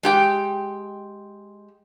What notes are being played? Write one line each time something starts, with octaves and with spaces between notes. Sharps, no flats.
G#3 G4 G5